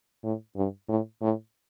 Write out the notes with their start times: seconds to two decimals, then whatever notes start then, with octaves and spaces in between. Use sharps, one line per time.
0.24 A2
0.56 G2
0.89 A2
1.22 A2